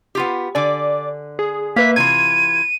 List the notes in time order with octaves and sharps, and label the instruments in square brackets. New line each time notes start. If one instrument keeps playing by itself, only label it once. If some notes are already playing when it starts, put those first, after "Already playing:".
[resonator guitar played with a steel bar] B3 F4 G4
[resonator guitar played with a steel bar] D3 G#5 [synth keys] D5 D6
[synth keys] G#4
[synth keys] A#3 B4 E5 [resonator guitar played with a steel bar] F5 [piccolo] B6
[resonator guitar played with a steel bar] C3 E3 F4 [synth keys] G#6 [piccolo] D#7